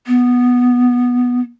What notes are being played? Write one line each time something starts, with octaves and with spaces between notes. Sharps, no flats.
B3